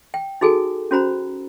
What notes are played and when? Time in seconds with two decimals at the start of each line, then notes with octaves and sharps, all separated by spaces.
0.14 G5
0.41 D#4 F#4 G#4 A4 G#5
0.91 C#4 F#4 C5 A#5 B5